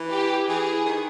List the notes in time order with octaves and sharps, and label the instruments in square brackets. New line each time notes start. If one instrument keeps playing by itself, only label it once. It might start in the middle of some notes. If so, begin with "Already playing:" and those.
Already playing: [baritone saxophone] E3
[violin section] G4
[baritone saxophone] E3 [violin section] G#4
[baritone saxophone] D#3